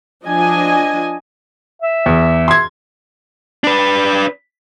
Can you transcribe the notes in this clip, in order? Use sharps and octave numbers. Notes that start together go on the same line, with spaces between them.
F3 D4 D#5 G#5
E5
E2
C6 G#6
D4 B4